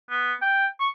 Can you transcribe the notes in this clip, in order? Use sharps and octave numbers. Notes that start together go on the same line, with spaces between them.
B3
G5
C#6